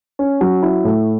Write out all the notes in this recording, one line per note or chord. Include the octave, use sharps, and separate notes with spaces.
C#4
F#3
E4
A2